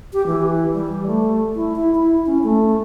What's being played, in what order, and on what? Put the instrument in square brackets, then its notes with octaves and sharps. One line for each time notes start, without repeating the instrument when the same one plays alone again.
[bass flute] G4
E3
G3
A3
E4
E4
E4
C#4
A3